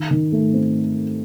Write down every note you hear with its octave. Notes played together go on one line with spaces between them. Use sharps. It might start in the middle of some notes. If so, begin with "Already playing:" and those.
Already playing: D#3
D#3
A3
C4